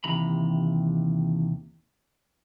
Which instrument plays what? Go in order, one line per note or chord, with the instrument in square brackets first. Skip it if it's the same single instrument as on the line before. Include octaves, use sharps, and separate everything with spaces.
[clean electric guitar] D#2 C3 E3 A#5 B5